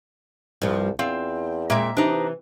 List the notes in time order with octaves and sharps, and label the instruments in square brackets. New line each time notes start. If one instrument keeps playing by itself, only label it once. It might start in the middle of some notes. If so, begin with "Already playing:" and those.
[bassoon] C2 [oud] G2 F3
[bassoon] E2 [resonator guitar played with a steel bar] C4 [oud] F4
[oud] A#2 G#3 C4 [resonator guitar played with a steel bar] A#3 E5
[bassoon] C3 [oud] E3 [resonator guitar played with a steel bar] D4 D#4